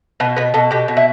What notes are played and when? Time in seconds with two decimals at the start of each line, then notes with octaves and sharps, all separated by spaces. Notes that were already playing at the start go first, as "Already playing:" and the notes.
0.20 B2 B4
0.37 B2 B4
0.54 B2 A4
0.71 B2 G4
0.88 B2
0.97 E4